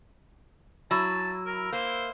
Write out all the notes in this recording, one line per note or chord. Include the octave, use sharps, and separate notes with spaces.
F#3 E4 A5
A#4
A#3 C5